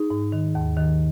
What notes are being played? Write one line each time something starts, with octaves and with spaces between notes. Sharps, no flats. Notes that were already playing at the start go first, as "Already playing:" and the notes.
Already playing: D#4 G#4
G#2
D#3
D#2
D#3